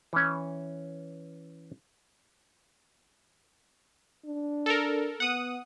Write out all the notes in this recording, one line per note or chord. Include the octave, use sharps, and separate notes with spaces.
E3 C#4
D4
A4 A#4
B3 F#5 D#6